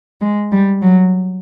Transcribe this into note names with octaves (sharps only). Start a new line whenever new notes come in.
G#3
G3
F#3